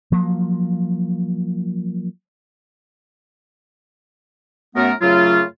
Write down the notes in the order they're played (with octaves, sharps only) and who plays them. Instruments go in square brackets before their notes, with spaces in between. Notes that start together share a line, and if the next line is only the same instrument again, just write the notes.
[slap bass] F3 F#3 A#3
[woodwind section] F#2 A3 B3 A#4
F#2 C#3 F#3 A3 F4